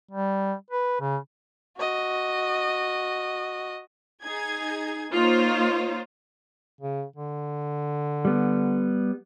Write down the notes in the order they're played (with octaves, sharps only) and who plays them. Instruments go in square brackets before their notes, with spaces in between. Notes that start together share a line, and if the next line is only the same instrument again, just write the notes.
[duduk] G3
B4
C#3
[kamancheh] F#4 D#5
[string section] D#4 G#4 G#6
A#3 D#4 F4 C5 C#5
[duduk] C#3
D3
[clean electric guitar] G3 B3